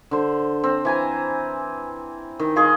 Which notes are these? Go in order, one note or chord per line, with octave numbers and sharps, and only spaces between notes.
D3 C5
C4
E3 G#5 A#5
D#3
F4 G#4 D#5 F5